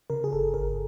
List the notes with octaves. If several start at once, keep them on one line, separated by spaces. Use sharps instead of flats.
C#3 A#4
G#4
G1 A4
G1 A#4